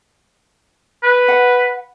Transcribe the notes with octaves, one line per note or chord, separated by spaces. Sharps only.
B4
F#5